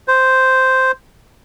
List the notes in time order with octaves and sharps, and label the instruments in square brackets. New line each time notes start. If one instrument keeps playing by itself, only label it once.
[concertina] C5